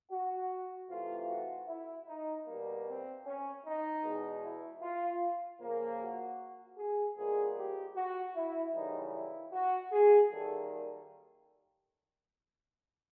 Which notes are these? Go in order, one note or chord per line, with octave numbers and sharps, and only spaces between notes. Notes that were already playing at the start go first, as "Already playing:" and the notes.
F#4
C3 E3 A3 F4
F#4
E4
D#4
B2 G3 A#3
C4
C#4
D#4
E2 B2 G#3
E4
F4
C#3 F3 A#3
F#4
G#4
A#2 F3 G#3 B3 G#4
G4
F#4
E4
F#2 C#3 E3 G3 D#4
E4
F#4
G#4
F#2 D#3 G3 A#3 A4